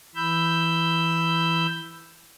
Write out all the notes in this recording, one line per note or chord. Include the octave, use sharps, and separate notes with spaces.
E3 B5 E6 G6